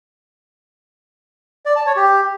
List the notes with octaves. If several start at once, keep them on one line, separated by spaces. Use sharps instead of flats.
D5
A5
C#5
G4